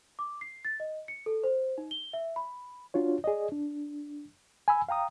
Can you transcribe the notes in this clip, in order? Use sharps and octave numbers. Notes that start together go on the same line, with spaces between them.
D6
C7
A6
D#5
C#7
A4
C5
D#4
G7
E5
B5
D4 F4 F#4 C#5
G#4 D5 D#5
D4
G#5 B5 E6
F5 G5 A#5 D#6